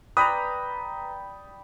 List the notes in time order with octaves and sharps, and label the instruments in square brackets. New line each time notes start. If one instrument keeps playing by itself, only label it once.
[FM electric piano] B4 A#5 [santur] D5 G5 B5 [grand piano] D#6